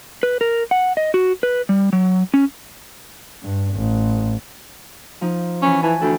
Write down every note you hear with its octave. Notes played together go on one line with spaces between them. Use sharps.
B4
A#4
F#5
D#5
F#4
B4
G3
F#3
C#4
G2
A1
F3 D#4
E3 C#4 B4 C#6
E3 G#5 A5
D2 A4 B4 G5